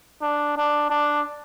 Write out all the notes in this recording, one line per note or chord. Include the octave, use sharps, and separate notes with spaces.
D4
D4
D4